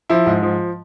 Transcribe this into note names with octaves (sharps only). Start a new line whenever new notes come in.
F3 E4
G#2
F3